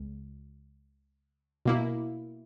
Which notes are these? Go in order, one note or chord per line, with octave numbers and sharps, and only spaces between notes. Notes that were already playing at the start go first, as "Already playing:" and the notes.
Already playing: C#2
B2 A#3 E4